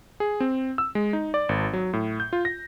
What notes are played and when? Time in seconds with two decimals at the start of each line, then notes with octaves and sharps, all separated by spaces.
0.20 G#4
0.40 C4
0.78 E6
0.95 G#3
1.13 D#4
1.34 D5
1.49 G#1
1.73 F#3
1.93 A2
2.20 G6
2.33 F4
2.45 A#6